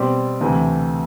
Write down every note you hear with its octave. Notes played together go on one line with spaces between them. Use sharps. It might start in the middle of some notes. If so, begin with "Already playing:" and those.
Already playing: B2 G3 C4 G4
D2 C3 E3 A3